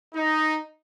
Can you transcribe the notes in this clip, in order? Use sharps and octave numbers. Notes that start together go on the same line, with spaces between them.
D#4